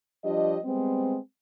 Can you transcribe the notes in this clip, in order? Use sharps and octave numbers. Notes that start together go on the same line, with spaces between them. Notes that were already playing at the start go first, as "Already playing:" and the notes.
F3 G3 D4 G4 D#5
G3 G#3 B3 C4